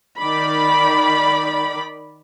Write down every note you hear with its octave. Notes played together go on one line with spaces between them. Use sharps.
D#3 D5 B5